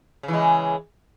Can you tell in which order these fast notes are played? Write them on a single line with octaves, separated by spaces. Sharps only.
C#3 E3 G#3